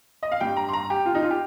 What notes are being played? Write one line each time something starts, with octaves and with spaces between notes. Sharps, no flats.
D#5
F5
G2 G3 G5
A#5
C6
A#5
G4
F4
D#4
F4
G4